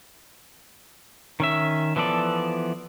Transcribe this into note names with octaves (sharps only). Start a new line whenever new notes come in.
D#3 C#4 E5
E3 F3 B3 A4 D5